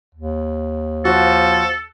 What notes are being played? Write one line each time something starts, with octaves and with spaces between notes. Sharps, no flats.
D#2
F3 F#4 A4